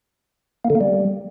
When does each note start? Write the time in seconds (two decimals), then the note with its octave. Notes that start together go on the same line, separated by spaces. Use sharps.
0.65 A#3
0.70 D3
0.75 A#3
0.81 G3